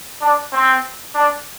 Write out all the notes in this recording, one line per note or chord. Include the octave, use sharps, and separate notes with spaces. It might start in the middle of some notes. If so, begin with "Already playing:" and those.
D4
C4
D4